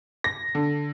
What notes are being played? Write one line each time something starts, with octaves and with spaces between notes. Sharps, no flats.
A#6
D3